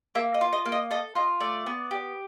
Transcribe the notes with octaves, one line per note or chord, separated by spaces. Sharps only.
A#3 E5
D#5
F4
D#5
A#3
D#5
A4 D#5
F4 D#5
A3 D5
B3
G4